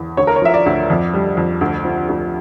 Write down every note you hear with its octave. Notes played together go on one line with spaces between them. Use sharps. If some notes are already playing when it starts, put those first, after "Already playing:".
Already playing: E2
D2 C#5
A#4
C#5
F3 E5
D5
D2
F2
G3
F2
D2
F3
D2